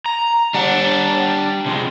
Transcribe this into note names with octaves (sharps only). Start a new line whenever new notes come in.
A#5
G3 D4 F#5
C3 F3 G#3